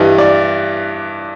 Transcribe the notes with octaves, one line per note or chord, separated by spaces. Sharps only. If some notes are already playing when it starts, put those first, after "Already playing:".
Already playing: G2 E3 G3 D#5
D5